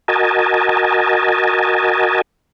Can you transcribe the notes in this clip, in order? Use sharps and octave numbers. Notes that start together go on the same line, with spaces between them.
F#4 A#4 D#5 G#5 A5